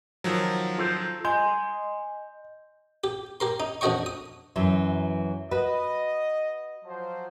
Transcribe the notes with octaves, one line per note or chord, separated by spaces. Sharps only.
D#3 F3 F#3
F4 A4 C5
D#5 G#5 C6 G6
G4
G4 A#4 C6
D#4
F2 D3 F#4 D#5 G5 C#6
D#6
F#2 E3 F#3
F#4 B4 D#5
F3 F#3 C5